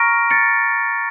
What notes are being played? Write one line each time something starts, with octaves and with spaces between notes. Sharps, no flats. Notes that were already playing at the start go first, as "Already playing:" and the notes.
Already playing: A#5 C#6 F6 A#6 D7
A6 C#7